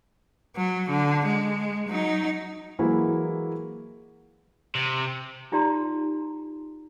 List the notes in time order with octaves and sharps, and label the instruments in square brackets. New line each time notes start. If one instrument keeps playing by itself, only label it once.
[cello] F#3
D3
G#3
F#3 D#4
[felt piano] E3 F#3 G#3 A#3 E4
[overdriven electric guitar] C3
[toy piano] D#4 F4 G4 D5 A#5 C6